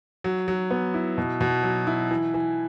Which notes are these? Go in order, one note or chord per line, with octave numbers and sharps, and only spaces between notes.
F#3
F#3
B3
E4
B2
B2
F#3
E4
E3
E3